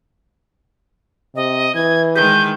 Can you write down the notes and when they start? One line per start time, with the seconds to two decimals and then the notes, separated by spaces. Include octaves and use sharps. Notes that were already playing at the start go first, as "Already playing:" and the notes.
1.36 C3 D#5
1.75 E3 G#6
2.16 D#3 G#3 G6